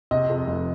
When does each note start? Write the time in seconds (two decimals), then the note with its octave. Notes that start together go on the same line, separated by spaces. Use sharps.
0.11 C3 D#5
0.30 F2
0.47 F1